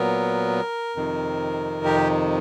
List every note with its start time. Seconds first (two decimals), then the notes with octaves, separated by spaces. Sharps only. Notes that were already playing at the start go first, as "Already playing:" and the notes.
Already playing: A#2 F#3 B3 A#4
0.96 F2 C3 D#3
1.85 G4